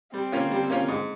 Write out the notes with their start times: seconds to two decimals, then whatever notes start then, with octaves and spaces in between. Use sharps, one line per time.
0.13 G3 C4
0.32 A#3 C#4 F4
0.51 G3
0.69 A#3 C#4 F4
0.88 G#2